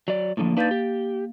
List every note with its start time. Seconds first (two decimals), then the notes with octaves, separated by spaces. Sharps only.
0.08 F#3 D5
0.37 A2 D3 F3 A#3
0.57 D4 D#4 B4 F5 G6 A6
0.71 G4